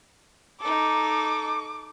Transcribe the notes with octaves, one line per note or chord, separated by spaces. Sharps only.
D#4 A4 D6